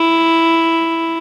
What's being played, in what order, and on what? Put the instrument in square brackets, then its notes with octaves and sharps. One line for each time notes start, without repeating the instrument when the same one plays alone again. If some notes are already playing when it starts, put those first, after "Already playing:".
Already playing: [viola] E4